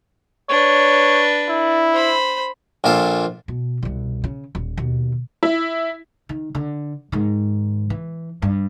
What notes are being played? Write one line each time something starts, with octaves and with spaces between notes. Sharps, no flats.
D4 B4 C#5
E4
C5 B5
A#1 A#2 F4 A4
B2
C2 B2
C#3
D#1
D#2 B2
E4
D#3
D3
G#2 D#3
E3
G2